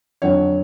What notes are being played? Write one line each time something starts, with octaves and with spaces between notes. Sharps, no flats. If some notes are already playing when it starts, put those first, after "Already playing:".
F2 D3 F#3 C#5